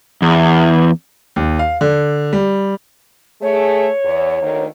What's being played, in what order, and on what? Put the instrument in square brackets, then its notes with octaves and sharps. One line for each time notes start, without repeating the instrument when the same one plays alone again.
[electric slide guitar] E2
[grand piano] D#2
F5
D3
G3
[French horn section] A3 G#4 [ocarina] C#5
[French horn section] E2
D2 D#3 A#3